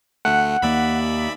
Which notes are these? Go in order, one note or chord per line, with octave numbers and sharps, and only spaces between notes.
D2 A3 F#5
D#2 D#3 A#3 D5 E5 B5